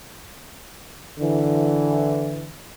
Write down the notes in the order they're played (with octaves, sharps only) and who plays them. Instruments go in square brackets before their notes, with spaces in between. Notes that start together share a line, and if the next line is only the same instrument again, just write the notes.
[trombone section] D3 E3